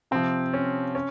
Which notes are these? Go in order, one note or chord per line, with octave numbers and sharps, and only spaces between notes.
C3 F3 C4
C#4
C#4